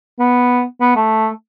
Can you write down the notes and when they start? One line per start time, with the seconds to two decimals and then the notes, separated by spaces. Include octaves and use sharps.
0.19 B3
0.81 B3
0.96 A3